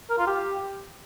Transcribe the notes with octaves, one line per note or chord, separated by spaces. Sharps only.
A#4
F4
G4